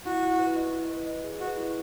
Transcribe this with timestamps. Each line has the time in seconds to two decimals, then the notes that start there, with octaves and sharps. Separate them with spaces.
0.05 E4 F#4
0.22 E4
0.39 B4
0.56 D#5
0.73 E4
0.90 B4
1.07 D#5
1.24 G#4
1.40 F#4 B4
1.57 E4